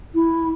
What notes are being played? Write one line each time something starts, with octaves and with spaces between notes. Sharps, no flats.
E4